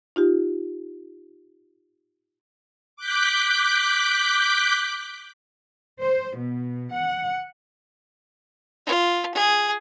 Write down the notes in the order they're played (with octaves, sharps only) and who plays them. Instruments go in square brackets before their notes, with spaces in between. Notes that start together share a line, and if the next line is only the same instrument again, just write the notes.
[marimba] D#4 F4 G4
[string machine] D6 F#6 G6 B6
[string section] C5
B2
F#5
[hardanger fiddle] F4
G#4